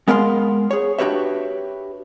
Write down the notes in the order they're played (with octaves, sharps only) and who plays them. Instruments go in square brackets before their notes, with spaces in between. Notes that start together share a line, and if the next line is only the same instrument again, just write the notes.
[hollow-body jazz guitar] G#3 B3 A#4 F5 G#5 C6
G#4 C#5
D4 F#4 G4 B4 C#5 E5